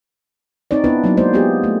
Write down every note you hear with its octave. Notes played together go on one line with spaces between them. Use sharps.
C4 D#4 C#5 D5
B3 D4 E4 B4
F#3 A#3 B3 D#4
G#3 A#3 C5 D5
G#3 B3 F4 G4 G#4
A3